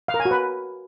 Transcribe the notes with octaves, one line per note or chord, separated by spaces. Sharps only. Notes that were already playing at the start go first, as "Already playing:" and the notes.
F5
A#4
G#5
F#4
B4